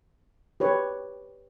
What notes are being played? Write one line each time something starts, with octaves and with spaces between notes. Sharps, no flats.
G4 B4 C#5